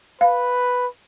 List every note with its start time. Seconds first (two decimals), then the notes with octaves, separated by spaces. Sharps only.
0.21 B4 F5